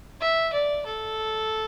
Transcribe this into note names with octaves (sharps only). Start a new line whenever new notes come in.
E5
D5
A4